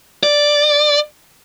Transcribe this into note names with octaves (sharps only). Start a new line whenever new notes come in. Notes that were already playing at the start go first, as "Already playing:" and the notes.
D5